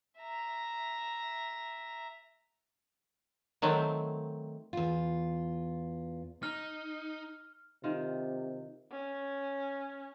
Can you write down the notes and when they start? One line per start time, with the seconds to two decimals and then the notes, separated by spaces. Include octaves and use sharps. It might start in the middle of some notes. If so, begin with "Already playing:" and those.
0.19 E5 A#5
3.62 D#3 F#3 A3 C4
4.73 E2 F4
6.43 D#4 F6
7.84 C3 D#3 F4
8.92 C#4